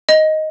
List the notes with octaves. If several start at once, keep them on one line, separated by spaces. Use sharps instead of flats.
D#5